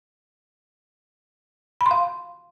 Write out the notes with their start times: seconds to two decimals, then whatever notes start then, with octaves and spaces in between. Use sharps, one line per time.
1.81 B5
1.86 C6
1.91 F5